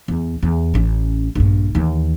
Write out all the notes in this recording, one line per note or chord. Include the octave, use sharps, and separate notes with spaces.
E2
E2
A1 C#4
A#1 G2
D#2 E3